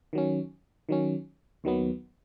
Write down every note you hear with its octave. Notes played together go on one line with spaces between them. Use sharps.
D#3 F#3 C#4
D#3 F#3 C#4
D#2 D#3 F#3 B3